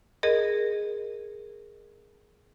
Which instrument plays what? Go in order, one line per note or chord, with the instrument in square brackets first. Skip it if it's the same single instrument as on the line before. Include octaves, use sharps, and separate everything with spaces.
[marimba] G#4 A#4 D#5